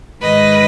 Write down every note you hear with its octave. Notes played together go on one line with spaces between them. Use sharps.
G#2 D#3 G#3 B4 D#5